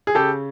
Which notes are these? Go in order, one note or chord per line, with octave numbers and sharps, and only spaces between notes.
G#4
C#3 G4 A4